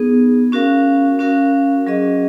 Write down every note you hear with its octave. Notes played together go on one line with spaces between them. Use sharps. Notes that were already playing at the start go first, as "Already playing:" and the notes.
Already playing: B3 D#4 G#4
C#4 F#4 A#4 F5
C#4 F#4 A#4 F5
F#3 C#4 G#4 D#5